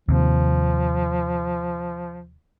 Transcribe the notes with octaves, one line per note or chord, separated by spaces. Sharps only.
D#2 C3 F3